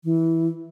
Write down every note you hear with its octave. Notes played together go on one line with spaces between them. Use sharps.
E3